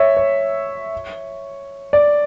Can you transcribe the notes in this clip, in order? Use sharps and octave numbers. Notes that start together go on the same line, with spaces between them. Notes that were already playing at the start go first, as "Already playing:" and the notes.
Already playing: C#5 E5
C#5
D5